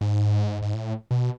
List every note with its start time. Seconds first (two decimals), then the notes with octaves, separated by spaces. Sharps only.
0.01 G#2
0.62 G#2
0.74 A2
1.11 B2